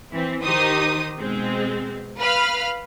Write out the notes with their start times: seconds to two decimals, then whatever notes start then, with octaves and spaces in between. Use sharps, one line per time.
0.11 E3 C4
0.43 D#3 D#4 G4 C5 D#6
1.18 B2 G#3 C4
2.19 B4 F5 B5 F6